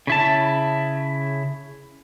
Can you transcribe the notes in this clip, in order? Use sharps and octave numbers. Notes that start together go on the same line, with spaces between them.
C#3 E4 A5